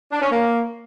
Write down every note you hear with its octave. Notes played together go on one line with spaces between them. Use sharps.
D4
C#4
A#3